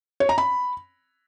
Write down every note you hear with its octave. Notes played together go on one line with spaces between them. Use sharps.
C#5
A#5
B5